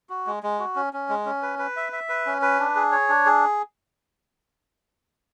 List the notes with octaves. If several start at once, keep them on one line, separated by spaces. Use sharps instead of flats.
F#4
G#3
G#3
F#4
C#4
C#4
G#3
C#4
B4
B4
E5
E5
B4
C#4
B4
D4
G#4
C#5
D4
G#4